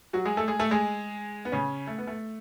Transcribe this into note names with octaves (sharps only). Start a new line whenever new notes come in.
F#3 F#4
G#3 G#4
A3 A4
G#3 G#4
A3 A4
G#3 G#4
B3
C#3 C#4
A3
B3
A3